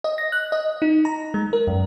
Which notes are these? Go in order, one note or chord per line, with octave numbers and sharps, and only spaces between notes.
D#5
A#6
F#6
D#5
D#4
A#5
G#3
A#4
F#2